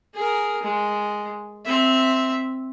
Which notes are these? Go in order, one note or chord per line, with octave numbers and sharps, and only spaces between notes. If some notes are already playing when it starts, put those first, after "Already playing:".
G#4 A#4
G#3
C4 E5